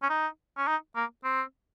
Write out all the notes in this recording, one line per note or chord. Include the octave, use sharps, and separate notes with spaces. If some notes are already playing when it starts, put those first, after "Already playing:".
C#4
D#4
C#4
D#4
A#3
C4